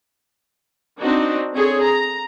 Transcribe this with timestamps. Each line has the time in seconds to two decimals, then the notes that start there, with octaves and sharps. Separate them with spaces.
1.01 C4 D4 D#4 F#4
1.54 C4 G#4 A4 C#5
1.83 A#5